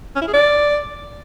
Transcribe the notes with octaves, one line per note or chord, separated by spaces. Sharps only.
C#4
E4
G#4
D5